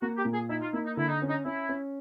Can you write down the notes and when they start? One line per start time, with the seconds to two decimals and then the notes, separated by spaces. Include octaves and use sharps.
0.02 A#3 F#4
0.18 G4
0.25 A#2
0.33 G#4
0.49 D#4 E4
0.62 F4
0.73 A#3 E4
0.85 D#4
0.97 D3 E4
1.08 D#4
1.22 C#4
1.29 D#4
1.45 C#4 E4
1.69 C#4